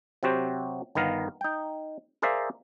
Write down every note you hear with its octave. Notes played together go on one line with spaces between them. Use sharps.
C3 F#3 C4 F#4 G4 C5
G1 D#3 B3 A#4 F5
D#4 G5
G#4 A#4 C5 D5 E5 F5